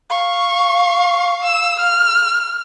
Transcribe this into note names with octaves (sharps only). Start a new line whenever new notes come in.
F5 C#6
E6
F6